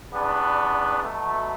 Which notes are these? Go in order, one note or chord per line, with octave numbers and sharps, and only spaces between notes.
E2 C#3 G3 B3 D4
B2 F#3 A3